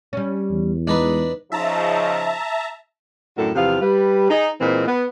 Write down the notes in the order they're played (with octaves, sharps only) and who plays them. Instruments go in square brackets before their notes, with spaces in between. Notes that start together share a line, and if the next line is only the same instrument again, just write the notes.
[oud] G3 C#4
[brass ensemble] E2
[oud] G#3 [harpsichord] D4 D#4 B4
[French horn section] C#3 F3 D#4 [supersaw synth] E5 A5 A#5
[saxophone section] F#2 A2 D3 F#4 A4 A#4
E2 C3 F3 B3 F5
G3 B4
D#4 G#4
A#2 E3 G#3 A#3 C4 B4
B3